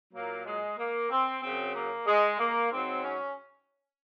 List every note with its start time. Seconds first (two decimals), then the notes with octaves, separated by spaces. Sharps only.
0.14 A#2 F#3 A#3
0.46 G#3
0.79 A#3
1.11 C4
1.42 F#2 C#3 F#3 C4
1.75 A#3
2.07 G#3
2.40 A#3
2.71 G#2 F#3 C4
3.04 C#4